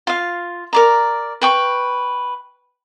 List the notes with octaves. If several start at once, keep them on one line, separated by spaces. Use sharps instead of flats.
F4 F5
A#4 D5 A#5
B4 G5 C#6